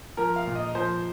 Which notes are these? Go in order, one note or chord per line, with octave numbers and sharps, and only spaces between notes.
F3 A#4
F5
A#2
D#5
F3 C5